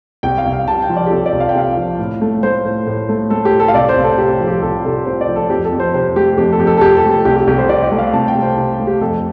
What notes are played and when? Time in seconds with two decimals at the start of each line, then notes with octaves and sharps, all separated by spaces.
0.23 C2 G5
0.38 F5
0.46 C2
0.52 F5
0.67 C3 A5
0.82 G5
0.89 F3
0.96 D5
1.06 G4
1.11 C2 A4
1.26 D5
1.33 C2
1.40 F5
1.49 G5
1.55 C3 F5
1.77 F3
1.99 A2
2.21 A3
2.43 A3 C5
2.65 A2
2.87 A2
3.09 A3
3.30 A3 A4
3.45 G4
3.52 A2
3.60 A4
3.68 F5
3.74 C2 D5
3.89 C5
3.97 C2
4.04 A4
4.18 C3 G4
4.40 F3
4.47 G4
4.62 C2 A4
4.84 C2 A4
5.06 C3 C5
5.21 D5
5.28 F3
5.36 A4
5.50 F2 G4
5.65 A4
5.73 F2
5.80 C5
5.94 C3 C5
6.16 A3 G4
6.38 F2 G4
6.52 A4
6.59 F2 G4
6.67 A4
6.77 A4
6.81 C3 G4
6.97 A4
7.03 A3
7.11 A4
7.25 C2 G4
7.37 G4
7.47 C2 G4
7.58 C5
7.69 C3 D5
7.84 D5
7.91 A3
7.99 F5
8.13 C2 A5
8.28 G5
8.35 C2
8.42 C5
8.57 C3
8.79 A3
8.87 G4
9.01 F2 A4